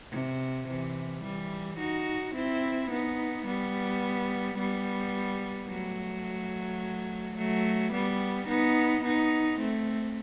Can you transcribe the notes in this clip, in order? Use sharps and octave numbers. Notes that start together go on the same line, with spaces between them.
C3
C3 E3
E3 G3
D#4 F#4
C4 E4
B3 D#4
G3 B3
G3 B3
F#3 A3
F#3 A3
G3 B3
B3 D#4
B3 D#4
A3 C4